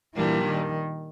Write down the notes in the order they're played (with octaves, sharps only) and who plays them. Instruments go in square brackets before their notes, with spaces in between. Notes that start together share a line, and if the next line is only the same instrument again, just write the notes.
[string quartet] A#2 G3 A#3 D4 [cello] E3
[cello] D#3